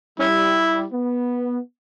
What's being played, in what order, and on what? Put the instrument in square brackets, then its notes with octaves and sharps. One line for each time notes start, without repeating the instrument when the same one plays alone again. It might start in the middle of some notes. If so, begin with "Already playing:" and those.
[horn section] G3 [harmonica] C#4 E4
[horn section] B3